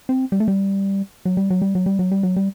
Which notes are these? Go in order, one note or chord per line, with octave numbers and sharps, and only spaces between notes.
C4
G3
A3
G3
F#3
G3
F#3
G3
F#3
G3
F#3
G3
F#3
G3